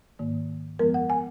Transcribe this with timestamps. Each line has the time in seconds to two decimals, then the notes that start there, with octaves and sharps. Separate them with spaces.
0.19 G#2 D#3 A#3
0.79 F#2 F3 G#3 B3 A#4
0.94 F#5
1.10 G#5